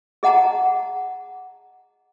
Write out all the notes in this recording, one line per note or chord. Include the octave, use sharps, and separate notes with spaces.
G#4 D#5 F#5 A5 A#5